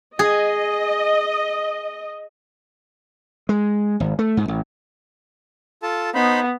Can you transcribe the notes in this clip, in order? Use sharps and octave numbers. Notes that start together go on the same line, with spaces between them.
G#4 D#5
G#3
G#1
A3
G#2
A1
F4 A4 A5
B3 D#4 C5 B5